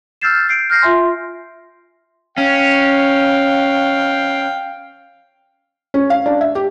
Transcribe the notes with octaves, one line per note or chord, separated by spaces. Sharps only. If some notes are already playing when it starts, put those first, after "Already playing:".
E6 F6 G6 A6 C7 E7
G6 C7 D7
F6 G6 A#6 C7
F4 E5 G#5 C6
C#4 F5 G5
C#4
F5
D4
E5
G4